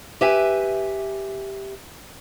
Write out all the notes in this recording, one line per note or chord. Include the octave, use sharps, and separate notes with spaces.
G4 B4 E5 G#5